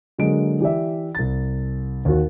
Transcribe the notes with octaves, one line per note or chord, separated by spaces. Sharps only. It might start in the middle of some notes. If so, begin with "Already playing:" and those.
D3 F#3 G#3 A#3 D7
E3 G4 D5 E5
C2 A6
D#2 F#4